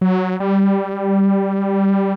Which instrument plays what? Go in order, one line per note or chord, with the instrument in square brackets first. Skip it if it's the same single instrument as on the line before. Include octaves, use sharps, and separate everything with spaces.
[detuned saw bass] F#3
G3